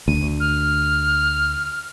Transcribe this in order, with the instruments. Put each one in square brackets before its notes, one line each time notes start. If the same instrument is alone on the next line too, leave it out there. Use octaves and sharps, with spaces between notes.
[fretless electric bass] D2 [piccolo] D#7
[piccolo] F6